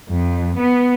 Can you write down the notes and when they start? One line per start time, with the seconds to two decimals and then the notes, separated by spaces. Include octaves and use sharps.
0.10 F2
0.58 B3